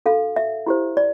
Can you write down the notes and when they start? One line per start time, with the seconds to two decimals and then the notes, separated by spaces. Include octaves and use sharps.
0.06 D4 F#4 A4 F5
0.36 E5
0.67 E4 G4 C5
0.97 D5